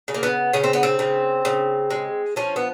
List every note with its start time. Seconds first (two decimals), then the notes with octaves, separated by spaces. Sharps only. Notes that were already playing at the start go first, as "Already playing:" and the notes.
0.08 C#3
0.15 A#3
0.23 B3
0.53 C#3 C#4
0.64 C4
0.73 B3
0.83 C4
0.99 C#3
1.45 C#3
1.91 G#3
2.36 F3 C#4
2.56 B3